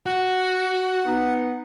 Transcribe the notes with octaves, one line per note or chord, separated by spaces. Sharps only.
F#4 F#5
B3 D#4